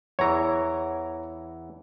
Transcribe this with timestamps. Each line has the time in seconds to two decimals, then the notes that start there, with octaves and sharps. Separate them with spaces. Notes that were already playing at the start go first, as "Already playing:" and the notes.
0.19 E2 E3 C#5 A#5